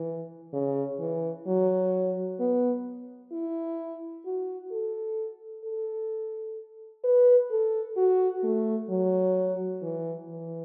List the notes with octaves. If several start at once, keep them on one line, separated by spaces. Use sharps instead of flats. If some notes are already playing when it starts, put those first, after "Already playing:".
Already playing: E3
C#3
E3
F#3
B3
E4
F#4
A4
A4
B4
A4
F#4
A3
F#3
E3
E3